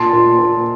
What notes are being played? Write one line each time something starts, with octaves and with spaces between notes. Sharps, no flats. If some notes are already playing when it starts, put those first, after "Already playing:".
Already playing: A#2 A5 C6
A#2
A#2